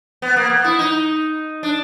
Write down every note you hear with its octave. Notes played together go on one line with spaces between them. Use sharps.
B3
A#3
B3
E4
D#4
D4